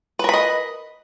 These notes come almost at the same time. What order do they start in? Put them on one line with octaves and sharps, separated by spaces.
B4 A#4 B5 D#5